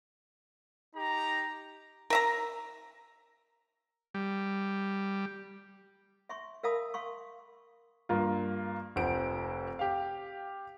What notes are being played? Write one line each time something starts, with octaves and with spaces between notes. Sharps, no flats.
D#4 G4 A#5
A#4 E5 A#5
G3
E5 C6 C#6
A#4 E5 F5 A5 B5 D#6
F5 C6 C#6
G2 A#3 F4
F1 F2 C5 F#5 D7
G4 F5